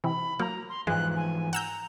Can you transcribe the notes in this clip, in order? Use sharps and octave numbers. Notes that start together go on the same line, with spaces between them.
C3 E3 B5
F#3 A#3 A#5
C6
G#2 E3 F3 G#3 F#6
G#5
F#5 A#5 E6 G6